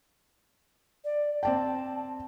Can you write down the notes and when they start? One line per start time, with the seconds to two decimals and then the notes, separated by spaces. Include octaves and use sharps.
1.04 D5
1.43 C4 D5 G5 A5